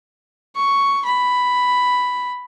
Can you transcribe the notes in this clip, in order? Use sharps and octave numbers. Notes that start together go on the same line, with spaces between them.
C#6
B5